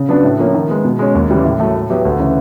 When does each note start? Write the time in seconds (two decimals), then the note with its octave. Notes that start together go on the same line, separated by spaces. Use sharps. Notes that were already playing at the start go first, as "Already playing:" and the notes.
Already playing: C#3
0.09 F#3 B3 D4
0.24 A2
0.39 F3 A#3 C#4
0.54 D#3
0.69 G#3 B3
0.85 B2
0.99 G#3 C#4
1.15 D#2
1.29 C#3 E3 G3 B3
1.44 A2
1.60 F#3 A3
1.75 A2
1.90 F#3 B3 E4 G4
2.05 D2
2.20 C#3 E3